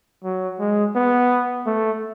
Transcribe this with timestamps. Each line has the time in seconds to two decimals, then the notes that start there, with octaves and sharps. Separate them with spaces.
0.24 F#3
0.59 G#3
0.95 B3
1.66 A3